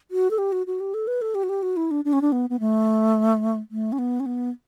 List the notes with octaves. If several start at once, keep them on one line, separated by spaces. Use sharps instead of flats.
F#4
A4
G4
F#4
F#4
G4
A4
B4
A4
G4
F#4
G4
F#4
E4
D4
D4
C#4
D4
B3
B3
A3
A3
C#4
B3
C#4
B3